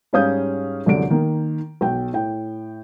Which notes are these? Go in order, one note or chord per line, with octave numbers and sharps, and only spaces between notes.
G#2 G3 C#4 F5 D#6 G6
C2 F#2 D3 D4 D7
D#3 A#3
B1 G5
A2 G5